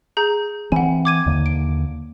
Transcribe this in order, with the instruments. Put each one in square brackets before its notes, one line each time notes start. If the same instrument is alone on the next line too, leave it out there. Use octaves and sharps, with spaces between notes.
[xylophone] G#4 A#5 G6
[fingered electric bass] E3 C4 [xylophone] F#5 G#5
[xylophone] D6 G#6 D#7
[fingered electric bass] D#2 D3 A#3
[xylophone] D7